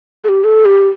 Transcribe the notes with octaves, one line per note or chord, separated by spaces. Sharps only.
A4
G4
A4
G4